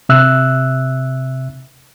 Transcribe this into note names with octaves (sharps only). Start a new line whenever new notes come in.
C3 E5 E6 F#6